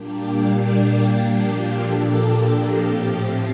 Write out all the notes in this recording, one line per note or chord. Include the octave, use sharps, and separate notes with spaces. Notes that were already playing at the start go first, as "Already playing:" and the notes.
Already playing: A#2 G3 A#3 D4 G4
A#2 F3 A#3 D4 G4
A4
G4
G4
A2 F3 C4 G4